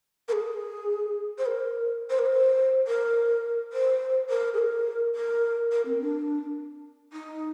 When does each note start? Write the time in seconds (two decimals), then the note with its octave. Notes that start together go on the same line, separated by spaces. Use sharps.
0.28 A#4
0.32 G#4
1.38 C5
1.46 A#4
2.10 C5
2.19 A#4
2.26 C5
2.87 A#4
3.73 C5
4.30 A#4
4.54 G#4
4.58 A#4
5.15 A#4
5.72 A#4
5.85 C4
6.01 D4
7.13 D#4